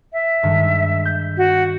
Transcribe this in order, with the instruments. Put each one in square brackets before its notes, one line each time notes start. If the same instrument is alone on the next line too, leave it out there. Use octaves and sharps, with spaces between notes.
[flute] E5
[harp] G2 D#3 G#3
G6
[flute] F#4